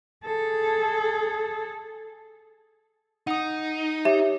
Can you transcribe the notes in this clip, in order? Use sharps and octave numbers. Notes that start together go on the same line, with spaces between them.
G#4 A4
D#4 F#5 D#6
G4 C#5 E5